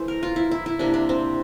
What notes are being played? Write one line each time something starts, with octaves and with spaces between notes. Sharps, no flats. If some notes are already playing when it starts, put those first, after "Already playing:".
Already playing: E3 A3 C5
A#4
F4
E4
E4
E4
C3 G3 A#3 D4
D4
C4